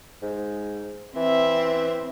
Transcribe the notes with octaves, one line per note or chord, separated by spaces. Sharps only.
G#2
E3 C4 E5